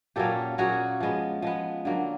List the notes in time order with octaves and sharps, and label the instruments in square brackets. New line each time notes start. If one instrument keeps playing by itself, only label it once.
[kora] A#2 F#3 A#3 C#4 G4 A4
A#2 F#3 A#3 C#4 F#4 G#4
F3 G#3 B3
F3 G#3 B3
D3 F#3 A#3